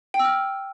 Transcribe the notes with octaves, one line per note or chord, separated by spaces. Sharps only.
G5
E6
F6